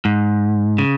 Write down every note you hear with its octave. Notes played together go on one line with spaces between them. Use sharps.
G#2
C#3